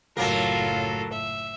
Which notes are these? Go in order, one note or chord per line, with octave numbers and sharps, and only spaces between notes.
F#1 A2 F#3 A#3 F4 A4 A#4
E5